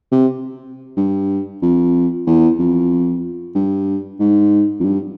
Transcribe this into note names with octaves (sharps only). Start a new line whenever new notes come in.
C3
G2
F2
E2
F2
G2
G#2
F2
G2